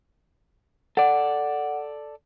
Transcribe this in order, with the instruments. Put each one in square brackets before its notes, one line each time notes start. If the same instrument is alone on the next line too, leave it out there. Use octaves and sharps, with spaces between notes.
[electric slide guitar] A4 D5 [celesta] F#5